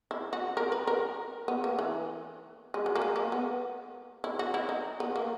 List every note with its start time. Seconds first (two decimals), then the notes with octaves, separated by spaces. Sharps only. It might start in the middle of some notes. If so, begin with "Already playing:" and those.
0.11 E4
0.33 F#4
0.57 A#4
0.72 B4
0.87 A#4
1.48 B3
1.64 A#3
1.79 E3
2.74 G#3
2.86 F#3
2.95 A#3
3.02 G#3
3.16 A#3
3.32 B3
4.24 E4
4.39 F#4
4.54 E4
4.69 D#4
5.00 B3
5.16 A#3